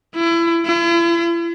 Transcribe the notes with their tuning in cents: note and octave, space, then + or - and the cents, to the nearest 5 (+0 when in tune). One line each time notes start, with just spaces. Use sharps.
E4 +30
E4 +45